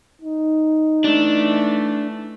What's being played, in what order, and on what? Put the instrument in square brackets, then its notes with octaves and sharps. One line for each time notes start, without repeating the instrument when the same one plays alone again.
[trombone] D#4
[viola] E3 A3 [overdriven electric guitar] D4